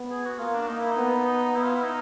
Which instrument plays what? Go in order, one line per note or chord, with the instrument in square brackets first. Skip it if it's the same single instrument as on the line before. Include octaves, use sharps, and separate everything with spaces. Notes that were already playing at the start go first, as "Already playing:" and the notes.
Already playing: [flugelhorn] B3
[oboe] G#4
F#4
[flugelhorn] A#3 [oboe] F4
[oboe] D4
[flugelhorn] A#3 [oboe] D#4
[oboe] E4
D#4
[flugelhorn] B3
[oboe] D#4
[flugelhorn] B3 [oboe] E4
[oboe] F4
E4
D#4